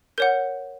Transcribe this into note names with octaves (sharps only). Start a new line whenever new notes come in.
A#4 C#5 F#5 G6